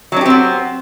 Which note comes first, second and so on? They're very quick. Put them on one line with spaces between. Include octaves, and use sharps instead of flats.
F#3 D4 G4 C4 B3